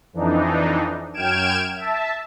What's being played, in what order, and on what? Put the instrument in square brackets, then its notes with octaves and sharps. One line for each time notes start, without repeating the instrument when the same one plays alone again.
[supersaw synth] F2 E3 D4 D#4
F#2 G5 F6 G#6 D7 E7
E5 A5